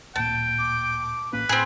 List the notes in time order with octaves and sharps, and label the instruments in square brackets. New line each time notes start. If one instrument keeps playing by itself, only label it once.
[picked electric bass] D1 A#2 [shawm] G5 [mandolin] A5
[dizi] D6
[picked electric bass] A1 A#3 C#4 [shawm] B4
[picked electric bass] A2 [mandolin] C4 G#4 [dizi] B5